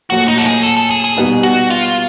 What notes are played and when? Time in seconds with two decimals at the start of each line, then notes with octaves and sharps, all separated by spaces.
0.10 A#2 F#3 A3 F#4
0.28 D#4
0.38 A4
0.45 G#4
0.63 A4
0.77 A4
0.91 G#4
1.04 G#4
1.16 B2 G3 B3 D#4
1.43 F#4
1.70 F4